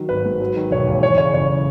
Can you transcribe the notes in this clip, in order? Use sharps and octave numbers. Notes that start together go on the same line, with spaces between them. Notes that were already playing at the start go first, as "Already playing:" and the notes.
Already playing: D#3 F#3
G#1 B4
G#2
F#3
D#3
E1 C#5
D#2
E3 C#5
C#3 C#5
F#1 C#5